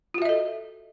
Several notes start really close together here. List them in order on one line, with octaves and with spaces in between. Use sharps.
F4 F#4 E5 D#5 A4